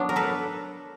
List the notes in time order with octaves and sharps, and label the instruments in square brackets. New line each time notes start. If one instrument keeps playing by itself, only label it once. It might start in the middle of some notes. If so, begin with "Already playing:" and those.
Already playing: [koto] F#3 B3 D4
A#4
A4 B4